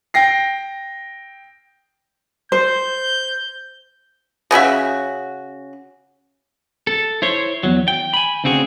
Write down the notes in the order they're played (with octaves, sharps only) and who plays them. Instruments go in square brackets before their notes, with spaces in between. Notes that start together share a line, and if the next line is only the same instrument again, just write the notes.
[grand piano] G5 A#6 C7
[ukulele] C5 [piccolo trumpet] G6
[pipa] C#3 C#4 F#4 E5
[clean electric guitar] A4
E4 C5 C#5
E2 F#3
G5
G#5 B5
D2 C#3 C4 F#4 G#4